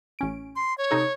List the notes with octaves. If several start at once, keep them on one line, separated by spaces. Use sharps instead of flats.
A1 C#4 D7
C6
C#5
C3 D#4 A4